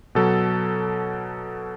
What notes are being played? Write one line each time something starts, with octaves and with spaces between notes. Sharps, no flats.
B2 F#3 A4